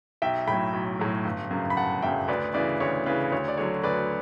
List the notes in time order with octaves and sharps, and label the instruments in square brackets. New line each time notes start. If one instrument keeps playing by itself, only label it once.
[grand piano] B1 E5 G5
A2 F#3 G5 B5
B1
A2 F#3
G1
F#2 C#3
B5
G1 F#5 A5
F#2 C#3 E5 G5
D2 B4 D5
C#3 E3 B4 D5
D2 C#5
C#3 E3 B4
D2 C#5
D5
D3 F#3 C#5
D2 B4 D5